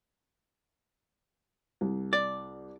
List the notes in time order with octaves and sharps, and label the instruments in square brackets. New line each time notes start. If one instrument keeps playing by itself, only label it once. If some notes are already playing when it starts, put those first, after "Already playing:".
[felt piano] C2
[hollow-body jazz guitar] D5